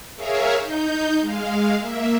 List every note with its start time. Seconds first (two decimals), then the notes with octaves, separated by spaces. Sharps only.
0.16 G#4 A#4 C#5 E5 F5
0.60 D#4 G6
1.20 G#3 F5
1.78 A#3 E5